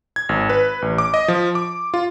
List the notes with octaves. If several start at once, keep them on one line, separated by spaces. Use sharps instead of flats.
G#6
G#1
B4
A1
D6
D#5
F3
D6
F4